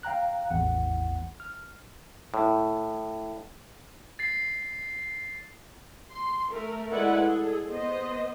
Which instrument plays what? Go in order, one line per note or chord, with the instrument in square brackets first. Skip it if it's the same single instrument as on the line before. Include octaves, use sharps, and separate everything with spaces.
[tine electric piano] F5 G5 A#5 F#6
A1 E2 F#5
F6
[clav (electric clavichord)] A2
[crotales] A6 C7
[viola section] C6
A3 A#4
G#3 E4 A4 B4 D5 F#5
G#4 A4
B3 C5 D#5